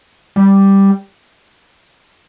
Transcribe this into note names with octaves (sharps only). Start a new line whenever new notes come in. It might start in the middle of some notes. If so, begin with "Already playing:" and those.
G3